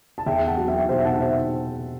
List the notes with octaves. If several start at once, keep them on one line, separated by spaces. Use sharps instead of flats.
A5
E2 E5 G5
F#5 A5
F#3
E5 G5
B2 C5 E5
F#5 A5
C5 E5